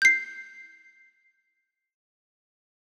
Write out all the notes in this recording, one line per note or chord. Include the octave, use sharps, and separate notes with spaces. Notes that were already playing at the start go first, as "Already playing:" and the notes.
G6 C7